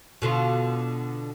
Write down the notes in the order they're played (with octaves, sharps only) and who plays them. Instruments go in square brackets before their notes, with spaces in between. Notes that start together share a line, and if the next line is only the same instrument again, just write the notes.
[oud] B2 D3 F4